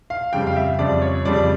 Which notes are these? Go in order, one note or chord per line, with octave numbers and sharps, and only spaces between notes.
F5
F2 C#3 G3 G5
F5
E5
F2 C#3 G3 D5
C#5
F2 C#3 G3 D5